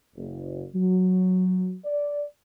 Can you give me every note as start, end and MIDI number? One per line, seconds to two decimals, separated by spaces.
0.16 0.64 30
0.75 1.76 54
1.85 2.22 74